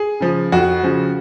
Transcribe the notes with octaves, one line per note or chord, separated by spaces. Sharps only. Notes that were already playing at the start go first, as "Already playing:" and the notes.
Already playing: G#4
C#3 F3
F2 F#4
C#3 F3